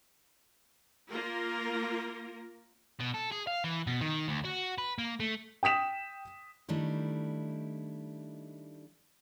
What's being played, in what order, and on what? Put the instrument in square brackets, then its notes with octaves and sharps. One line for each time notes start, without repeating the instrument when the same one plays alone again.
[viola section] A#3 F4 A#4
[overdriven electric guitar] B2
A4
G#4
F5
E3
B2
D#3
D2
F#4
B4
A#3
A3
[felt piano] G5 D#6 B6 E7
[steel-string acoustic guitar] D#3 G3 A3 D4 E4